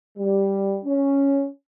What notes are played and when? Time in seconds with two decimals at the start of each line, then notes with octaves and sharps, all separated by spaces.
0.18 G3
0.85 C#4